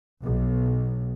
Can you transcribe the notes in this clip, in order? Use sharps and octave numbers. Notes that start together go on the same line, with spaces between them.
B1